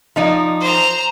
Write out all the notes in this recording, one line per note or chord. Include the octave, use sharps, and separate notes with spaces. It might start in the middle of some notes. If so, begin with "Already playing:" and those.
F3 D#4 D5
C5 A#5